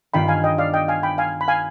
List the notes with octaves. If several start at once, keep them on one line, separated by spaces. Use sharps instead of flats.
G2 D#3 B3 F4 G5 B5
F5 G#5
D#5 G5
D5 F5
D#5 G5
F5 G#5
G5 B5
F5 G#5
B5
F5 G#5